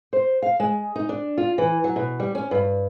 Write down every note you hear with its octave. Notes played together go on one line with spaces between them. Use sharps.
C5
F5
G#3
D#4
D4
F4
E3
F#3
B2
G3
C#4
G2